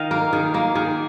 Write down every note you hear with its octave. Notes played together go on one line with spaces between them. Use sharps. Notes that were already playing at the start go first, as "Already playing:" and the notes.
Already playing: D#3 D#5 F5
A#3 A#4
D#3 G#4
A#3 A#4
D#3 G#4